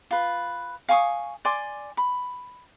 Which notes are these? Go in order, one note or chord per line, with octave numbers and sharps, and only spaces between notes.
F4 B4
F5 G#5 C#6 D#6
D5 G#5 C6 D6
B5